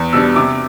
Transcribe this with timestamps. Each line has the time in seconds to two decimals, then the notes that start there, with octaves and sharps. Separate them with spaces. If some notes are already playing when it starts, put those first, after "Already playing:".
Already playing: E2
0.13 B2 G3 D4 E6
0.36 C3 D6